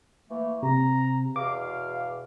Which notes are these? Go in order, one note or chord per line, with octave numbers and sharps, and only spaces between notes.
E3 A3 A#3
C3 A#5
E2 B2 F5 D6